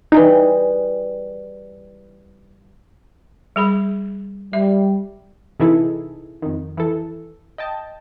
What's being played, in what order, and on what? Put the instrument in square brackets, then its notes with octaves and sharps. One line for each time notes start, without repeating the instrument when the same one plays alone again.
[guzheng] E3 G3 G#4 [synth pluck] D#4
[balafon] G3 G#4 B5
[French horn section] G3 [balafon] E5
[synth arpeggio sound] C3 E3 D#4 E4 G#4 A4
F2 D#3
E3 A4
D#5 G5 A5